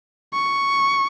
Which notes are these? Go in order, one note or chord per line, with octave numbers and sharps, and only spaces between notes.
C#6